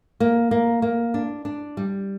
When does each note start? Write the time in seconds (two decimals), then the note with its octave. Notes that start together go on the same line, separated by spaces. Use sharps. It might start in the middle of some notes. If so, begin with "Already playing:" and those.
0.20 A#3
0.51 A#3
0.82 A#3
1.14 D4
1.45 D4
1.77 G3